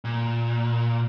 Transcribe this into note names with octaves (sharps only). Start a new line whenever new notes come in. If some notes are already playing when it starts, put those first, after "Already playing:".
A#2